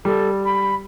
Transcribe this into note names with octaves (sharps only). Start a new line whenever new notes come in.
G3 A4
B5